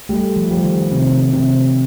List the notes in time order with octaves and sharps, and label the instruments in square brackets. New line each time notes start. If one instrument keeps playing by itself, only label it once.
[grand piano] G3 [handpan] A3
[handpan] F3
[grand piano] G3
[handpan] D#3
[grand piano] C3 [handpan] D#3
[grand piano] C3